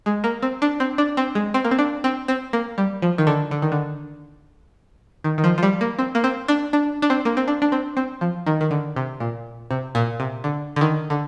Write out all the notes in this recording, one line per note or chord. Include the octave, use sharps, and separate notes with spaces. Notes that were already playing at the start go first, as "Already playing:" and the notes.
G#3
A#3
C4
D4
C4
D4
C4
G#3
C4
A#3
C4
D4
C4
C4
A#3
G3
F3
D#3
D3
D3
D#3
D3
D#3
D#3
F3
F3
G3
A#3
C4
A#3
C4
D4
D4
D4
C4
A#3
C4
D4
D4
C4
C4
F3
D#3
D#3
D3
C3
A#2
C3
A#2
C3
D3
D3
D#3
D3